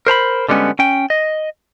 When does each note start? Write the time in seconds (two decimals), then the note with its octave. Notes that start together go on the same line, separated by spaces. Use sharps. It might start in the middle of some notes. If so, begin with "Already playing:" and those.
0.07 A#4 C5 A#5 B5
0.49 D3 G3 G#3 B3 C#4
0.79 C#4 G5
1.10 D#5